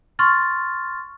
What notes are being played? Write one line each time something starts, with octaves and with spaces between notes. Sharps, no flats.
C6 C#6 F6 A6